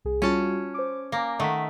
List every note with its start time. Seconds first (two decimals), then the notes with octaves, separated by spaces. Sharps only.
0.05 C2 G#4
0.22 G3 C#4 F4 F#4 A5
0.74 C5 D6
1.12 A#3 G#5 D6 A#6
1.39 D#3 A3 D#5 F#5 B6